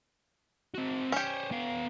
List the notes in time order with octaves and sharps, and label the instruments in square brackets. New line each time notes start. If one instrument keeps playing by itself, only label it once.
[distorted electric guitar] C4 F#4
[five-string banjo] C#4 G4 [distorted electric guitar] C5 C#5
[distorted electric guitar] B3 F5